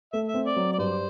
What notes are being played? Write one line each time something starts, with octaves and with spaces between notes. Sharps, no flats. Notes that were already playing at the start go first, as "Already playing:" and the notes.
A3 E5
E5
C4
D5
F#3
D5
G2 C5